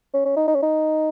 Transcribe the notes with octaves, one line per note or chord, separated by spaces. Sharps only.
C#4
C#4
D#4
D#4
C#4
D#4